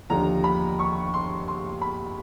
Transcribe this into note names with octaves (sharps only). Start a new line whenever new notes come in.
D#2 D3 F3 A#5
B5
C#6
C6
C6
B5